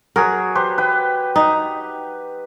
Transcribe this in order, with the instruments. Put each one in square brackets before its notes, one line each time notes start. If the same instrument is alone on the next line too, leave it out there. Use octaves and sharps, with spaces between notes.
[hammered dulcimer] F#3 G#4 [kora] A#4
[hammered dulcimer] G4 B4 C5
B4 G5
[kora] D#4